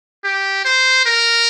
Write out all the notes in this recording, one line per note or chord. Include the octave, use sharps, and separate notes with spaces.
G4
C5
A#4